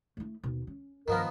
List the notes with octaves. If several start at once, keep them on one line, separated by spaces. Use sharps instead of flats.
A3 E4
D#2 B2
C#4
G2 D#3 F3 B3 A#4